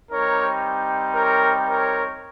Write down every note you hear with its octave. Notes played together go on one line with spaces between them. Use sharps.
G3 C4 D#4 G4 A#4 C#5
A#4 C#5
A#4 C#5